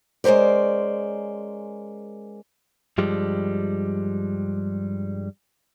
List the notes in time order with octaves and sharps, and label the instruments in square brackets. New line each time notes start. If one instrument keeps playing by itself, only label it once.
[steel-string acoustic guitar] G#3 C#4 A#4 C5 D5
[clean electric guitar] G2 F3 G3 G#3